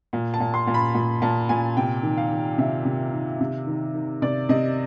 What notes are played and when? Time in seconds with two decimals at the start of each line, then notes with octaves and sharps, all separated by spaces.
0.13 A#2
0.34 A5
0.40 A#2
0.54 C6
0.67 A#2
0.74 B5
0.94 A#2
1.22 A#2 A5
1.49 A#2 G#5
1.77 C3 G5
2.03 D#3
2.17 F5
2.31 D#3
2.58 C3 E5
2.85 C3
3.13 D#3
3.40 C3
3.67 D#3
3.95 D#3
4.22 C3 D5
4.49 C3 D#5